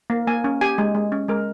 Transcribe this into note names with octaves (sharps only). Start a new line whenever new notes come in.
A#3
A#3 G#5
C#4
G4 G#5
G#3
G#3
C#4
G#3 A#4